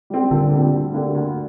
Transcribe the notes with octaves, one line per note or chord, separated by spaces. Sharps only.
G3 C4
A#2 D3
G3 C4
D2
D3 A#3 G4
D2